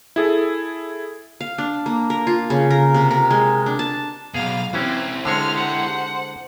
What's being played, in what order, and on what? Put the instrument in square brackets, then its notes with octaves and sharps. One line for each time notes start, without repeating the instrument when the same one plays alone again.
[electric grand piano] E4 G#4 A4
[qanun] F5
D4
A#3
A#4
F4
C#3
A#4
C3
A#4
G#3
D4
A5
[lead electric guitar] B1 B2 [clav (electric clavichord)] G#4 [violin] F5
[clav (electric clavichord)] E3 C#4 [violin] C4 [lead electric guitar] E4 G4
[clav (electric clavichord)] D3 G#3 C#5 [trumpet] C5 [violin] F6 C7
[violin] F#5